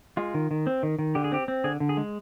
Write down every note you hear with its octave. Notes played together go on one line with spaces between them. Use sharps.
G#3 F4
D#3
D#3
C4
D#3
D#3
D3 G4
G#4
C4 G4
C4
D3 G#4
D3
G#4
G#3